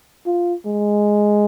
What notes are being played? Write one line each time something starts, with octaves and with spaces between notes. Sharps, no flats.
F4
G#3